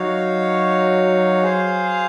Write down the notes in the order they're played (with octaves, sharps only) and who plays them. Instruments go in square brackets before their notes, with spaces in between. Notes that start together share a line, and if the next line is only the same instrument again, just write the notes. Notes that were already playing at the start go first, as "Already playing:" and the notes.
Already playing: [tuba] F#3 [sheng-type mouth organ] D#4 F#4 C#5 F5
[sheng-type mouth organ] G#4 C5 F5